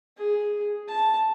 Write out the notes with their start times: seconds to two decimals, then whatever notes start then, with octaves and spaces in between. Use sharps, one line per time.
0.17 G#4
0.89 A5